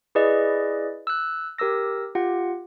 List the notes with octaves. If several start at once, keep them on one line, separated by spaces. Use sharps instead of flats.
E4 G#4 B4 D5 D#5
E6 F#6
G4 A#4 D6 E6 A#6
F4 G4 F#5